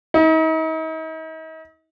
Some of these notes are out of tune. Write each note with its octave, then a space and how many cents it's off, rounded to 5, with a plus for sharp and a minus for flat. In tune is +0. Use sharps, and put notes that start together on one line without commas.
D#4 +40